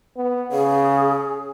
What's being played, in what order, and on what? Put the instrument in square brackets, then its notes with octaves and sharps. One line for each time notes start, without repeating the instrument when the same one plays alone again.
[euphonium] B3
[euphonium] C#3 [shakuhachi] G#4